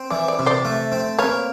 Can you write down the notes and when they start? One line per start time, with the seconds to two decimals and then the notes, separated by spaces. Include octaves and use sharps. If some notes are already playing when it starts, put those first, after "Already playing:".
Already playing: C4
0.10 E3 D5
0.28 D5
0.39 C3
0.46 C5 D5
0.65 A3
0.92 C4
1.19 A#3 B4 C#5